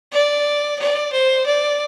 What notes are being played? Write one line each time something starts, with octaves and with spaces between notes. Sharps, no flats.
D5
D5
C5
D5